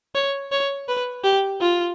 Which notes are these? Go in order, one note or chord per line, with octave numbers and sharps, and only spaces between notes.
C#5
C#5
B4
G4
F4